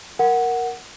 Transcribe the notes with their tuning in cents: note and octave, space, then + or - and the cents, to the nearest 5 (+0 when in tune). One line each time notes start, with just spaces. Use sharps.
A#4 +0 F#5 +0